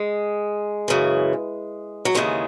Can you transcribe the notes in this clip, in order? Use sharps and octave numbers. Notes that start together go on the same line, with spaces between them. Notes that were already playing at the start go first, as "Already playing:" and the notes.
Already playing: G#3
F#2 C#3 E3
F#3
D#2 C#3 E3 G#3